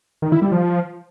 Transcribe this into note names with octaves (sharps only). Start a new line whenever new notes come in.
D#3
E4
G3
F3